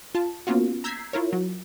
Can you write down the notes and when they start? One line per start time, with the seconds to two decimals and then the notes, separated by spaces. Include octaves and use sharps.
0.15 F4 A5
0.47 A#3 B3 C#4 F4 F#4
0.84 A#5 E6 G6 G#6 B6 C7
1.13 E4 F4 A#4 C#5
1.33 F#3